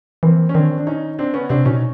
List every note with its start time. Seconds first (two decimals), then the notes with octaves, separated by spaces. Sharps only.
0.23 E3 A#3 C4
0.49 C#4
0.54 D#3 C4 D4
0.77 D4
0.87 C#4 D#4
1.19 D3 C4 D4
1.34 C#3 B3 C#4
1.49 C3 C4 D4
1.65 B2 C#4 D#4